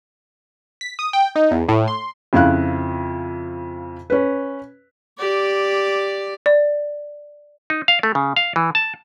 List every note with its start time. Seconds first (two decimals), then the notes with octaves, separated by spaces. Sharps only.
0.81 B6
0.99 D#6
1.13 G5
1.36 D#4
1.51 E2
1.69 A2
1.88 C6
2.33 F2 C#3 E4 F5 F#6
4.10 C#4 B4
5.19 G4 D5
6.46 D5
7.70 D#4
7.88 F5
8.03 A3
8.15 C#3
8.36 F5
8.56 E3
8.75 A5